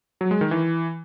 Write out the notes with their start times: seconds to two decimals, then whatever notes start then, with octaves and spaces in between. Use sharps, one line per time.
0.21 F#3
0.31 G#3
0.41 D#3
0.51 E3